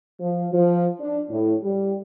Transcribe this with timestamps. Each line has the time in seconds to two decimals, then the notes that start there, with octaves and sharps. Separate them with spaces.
0.20 F3
0.53 F3
1.00 D4
1.29 A2
1.63 G3